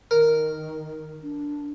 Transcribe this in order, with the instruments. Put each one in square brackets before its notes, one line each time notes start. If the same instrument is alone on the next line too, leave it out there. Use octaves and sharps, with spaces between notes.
[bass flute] D#3 [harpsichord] A#4
[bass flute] D4